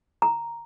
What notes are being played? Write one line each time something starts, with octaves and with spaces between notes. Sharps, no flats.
A#5